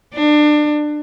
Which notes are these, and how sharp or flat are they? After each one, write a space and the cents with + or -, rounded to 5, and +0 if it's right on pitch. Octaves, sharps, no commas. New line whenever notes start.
D4 +25